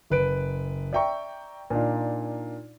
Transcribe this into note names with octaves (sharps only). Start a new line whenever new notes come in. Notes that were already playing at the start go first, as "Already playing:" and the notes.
F#1 B4 D7
D5 E5 G5 A#5 C#6
A#2 D4 D#4 F4